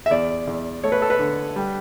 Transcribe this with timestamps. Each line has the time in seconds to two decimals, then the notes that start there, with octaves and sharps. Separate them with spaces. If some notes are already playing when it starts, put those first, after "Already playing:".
0.06 E5
0.11 E2 D5
0.47 E2
0.83 A3 C#5
0.92 B4
1.02 A4
1.10 B4
1.19 D3
1.56 G3